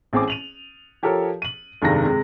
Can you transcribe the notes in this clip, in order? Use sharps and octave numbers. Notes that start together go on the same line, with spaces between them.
A1 C4 G#4 D6
D#7 F7 F#7
F3 G4 A4 A#4 C#5
D#7 F#7
F1 G2 C3 D#3 G#3 A#6
C3 G#3